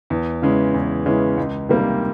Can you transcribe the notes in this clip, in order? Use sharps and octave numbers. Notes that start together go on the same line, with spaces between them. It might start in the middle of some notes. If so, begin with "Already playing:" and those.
E2
C#3 E3 G#3 C#4
E2
C#3 E3 G#3 C#4
C#2
C3 D#3 G3 A#3